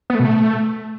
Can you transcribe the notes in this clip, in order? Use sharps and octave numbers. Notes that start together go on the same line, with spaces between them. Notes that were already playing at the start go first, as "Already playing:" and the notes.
B3
A3
B2
A3